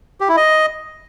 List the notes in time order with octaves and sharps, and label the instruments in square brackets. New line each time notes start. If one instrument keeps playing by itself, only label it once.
[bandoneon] G4
E4
D#5